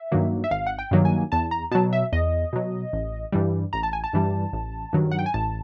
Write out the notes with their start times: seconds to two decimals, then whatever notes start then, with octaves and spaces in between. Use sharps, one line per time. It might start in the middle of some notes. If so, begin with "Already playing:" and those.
Already playing: E5
0.12 G2 D#3 F#3 A#3
0.44 E5
0.51 G#1 F5
0.67 F#5
0.79 G5
0.91 G2 D#3 F#3 A#3
1.05 G#5
1.32 E2 A5
1.51 A#5
1.71 B2 F#3 A5
1.93 E5
2.12 E2 D#5
2.53 B2 F#3
2.93 A1
3.32 G2 E3 G3
3.73 A1 A#5
3.83 A5
3.93 G#5
4.04 A5
4.13 G2 E3 G3
4.53 A1
4.93 G2 D#3 F#3
5.11 F#5
5.19 G5
5.26 G#5
5.34 A1 A5